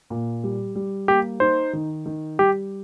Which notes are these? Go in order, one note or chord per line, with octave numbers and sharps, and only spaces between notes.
A#2
G3
G3
A#3 G4
D#4 C5
D#3
D#3
G3 G4